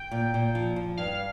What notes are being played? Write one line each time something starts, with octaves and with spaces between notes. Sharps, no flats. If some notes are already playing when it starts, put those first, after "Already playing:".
Already playing: G5
A#2
A#2
F3
F3
G2 F5